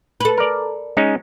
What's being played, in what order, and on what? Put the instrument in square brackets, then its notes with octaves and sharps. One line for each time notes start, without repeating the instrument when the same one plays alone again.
[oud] A4 B4
[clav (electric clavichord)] A#4 D5
G#3 C#4 D#4